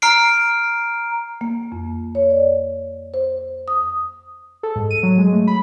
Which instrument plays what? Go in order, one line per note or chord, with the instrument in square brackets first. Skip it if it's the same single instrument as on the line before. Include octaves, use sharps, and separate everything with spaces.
[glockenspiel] A#5 F6 C7 D7
[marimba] A#3
F2
C#5
D5
C5
D#6
[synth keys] A4
G#2
D#7
F#3
G#3
A3
B5